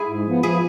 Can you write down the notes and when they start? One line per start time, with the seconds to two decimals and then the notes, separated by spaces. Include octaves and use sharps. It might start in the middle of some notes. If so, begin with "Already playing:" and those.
Already playing: E4 G#4
0.08 G#2
0.26 F3 B3
0.43 F3 E4 G#4